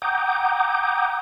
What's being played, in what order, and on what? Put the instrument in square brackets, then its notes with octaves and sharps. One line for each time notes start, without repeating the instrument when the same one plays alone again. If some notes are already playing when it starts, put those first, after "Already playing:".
[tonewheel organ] F#5 G5 A#5 D6 D#6 G6